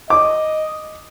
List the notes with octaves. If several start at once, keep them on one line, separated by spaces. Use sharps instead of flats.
D#5 D6